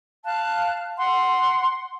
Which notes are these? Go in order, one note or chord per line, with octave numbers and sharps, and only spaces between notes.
F5 A5 F#6
F#5 C6